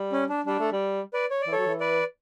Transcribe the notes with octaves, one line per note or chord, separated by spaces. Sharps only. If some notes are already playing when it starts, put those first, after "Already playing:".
Already playing: G3
C#4
D4
G3 D4
A3
G3
B4 D5
C#5
D5
E3
F#3 A4 C#5
E3
B4 D5